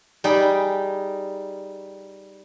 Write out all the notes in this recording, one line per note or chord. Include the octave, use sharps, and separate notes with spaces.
G3 D#4 G#4 G5 B5